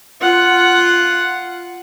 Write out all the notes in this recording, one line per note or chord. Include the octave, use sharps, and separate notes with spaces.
F4 F#5